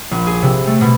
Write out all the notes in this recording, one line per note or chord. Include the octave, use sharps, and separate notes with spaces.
A#1
G#4
C3
A3
B2